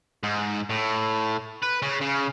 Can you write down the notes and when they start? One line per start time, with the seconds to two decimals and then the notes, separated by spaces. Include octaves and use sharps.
0.23 G#2
0.70 A2
1.62 B4
1.82 C#3
2.02 C#3